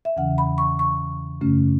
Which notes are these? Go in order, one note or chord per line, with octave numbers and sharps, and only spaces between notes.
E5
E2 C#3 E3 C#4 F#5
B5
C#6
C#6
F#2 C#3 A3 C#4